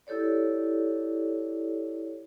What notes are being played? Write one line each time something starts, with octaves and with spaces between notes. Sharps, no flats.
E4 G4 A4 C#5 D5